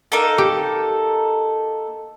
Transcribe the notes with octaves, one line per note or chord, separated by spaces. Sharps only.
A#3 D#4 A4
G4